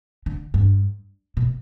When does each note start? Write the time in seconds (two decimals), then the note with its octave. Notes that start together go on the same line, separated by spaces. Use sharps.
0.26 D3
0.54 G2
1.37 B2